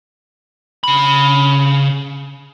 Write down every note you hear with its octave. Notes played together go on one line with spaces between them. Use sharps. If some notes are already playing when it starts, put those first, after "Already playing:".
C#3 B5